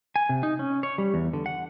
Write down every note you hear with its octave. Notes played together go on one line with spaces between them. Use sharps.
G#5
C3
D#4
C#4
C#5
G3
E2
D3
F#5